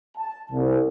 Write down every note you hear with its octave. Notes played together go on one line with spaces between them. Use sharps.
A5
C2